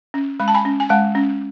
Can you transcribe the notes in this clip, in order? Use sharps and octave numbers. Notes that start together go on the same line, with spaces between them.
C#4
G#3 B5
A5
G#5 B5
C#4
G#5
G#3 F#5 A5
C#4